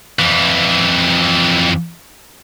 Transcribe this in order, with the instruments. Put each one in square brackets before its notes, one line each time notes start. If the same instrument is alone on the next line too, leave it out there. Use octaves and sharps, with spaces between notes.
[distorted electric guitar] F2 E3